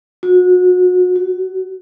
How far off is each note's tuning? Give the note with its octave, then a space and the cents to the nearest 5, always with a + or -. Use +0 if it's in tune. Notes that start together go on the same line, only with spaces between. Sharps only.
F#4 -35
F#4 +20